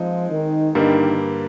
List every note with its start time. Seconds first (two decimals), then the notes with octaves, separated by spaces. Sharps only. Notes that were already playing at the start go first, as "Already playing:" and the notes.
Already playing: F3 G#3 C4 D#4
0.30 D#3
0.75 G2 D3 D#3 G3 A#3